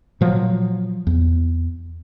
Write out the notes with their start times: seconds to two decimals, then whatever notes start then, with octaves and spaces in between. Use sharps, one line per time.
0.21 A#2 F3 F#3
1.07 E2